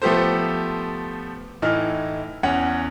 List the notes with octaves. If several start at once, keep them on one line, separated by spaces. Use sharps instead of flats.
F3 A3 B3 G4 A4 C5
A2 E3 D#4 F6
E2 C#4 C#5 F#5